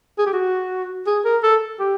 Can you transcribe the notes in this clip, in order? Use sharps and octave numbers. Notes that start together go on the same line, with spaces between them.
G#4
G4
F#4
G#4
A#4
A4
G4